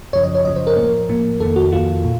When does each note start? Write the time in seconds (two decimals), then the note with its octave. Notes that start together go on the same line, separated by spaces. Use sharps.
0.13 F#2 C#3 F3 C#5
0.23 D#5
0.34 C#5
0.45 F#2 C#3 F3 D#5
0.56 C5
0.67 A#4
0.76 A2 F3 A#3
1.09 A2 F3 A#3
1.40 F2 D#3 A#3 A4
1.56 F#4
1.72 F2 D#3 A#3 F4
2.04 A#2